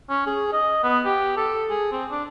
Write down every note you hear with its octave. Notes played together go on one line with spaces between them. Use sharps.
C#4
G#4
D#5
B3
G4
A4
G#4
C4
D4